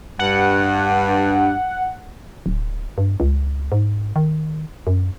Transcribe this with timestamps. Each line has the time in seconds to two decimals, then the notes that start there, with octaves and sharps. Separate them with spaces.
0.19 G2 F#5
2.46 D1
2.98 G2
3.20 C#2
3.72 G#2
4.16 D#3
4.87 F#2